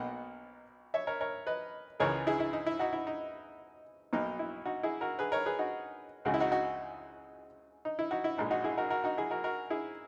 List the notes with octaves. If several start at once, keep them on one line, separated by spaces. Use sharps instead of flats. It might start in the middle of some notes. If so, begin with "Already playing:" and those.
Already playing: B1 B2 A#3 D#5 F#5
C#5 E5
A#4 C#5
A#4 C#5
B4 D#5
C#2 C#3 E3 G#3 A#4 C#5
E4 G#4
E4
D#4
E4
D#4 F#4
E4
D#4
B1 B2 F#3 A#3 D#4
E4
D#4 F#4
E4 G#4
F#4 A#4
G#4 B4
A#4 C#5
G#4 B4
D#4 F#4
C#2 C#3 G#3 F#4
E4
D#4 F#4
D#4 F#4
D#4
E4
D#4 F#4
E4
A#1 A#2 G#3 D#4
D#4 F#4
E4 G#4
F#4 A#4
F#4 A#4
D#4 F#4
E4 G#4
F#4 A#4
F#4 A#4
E4 G#4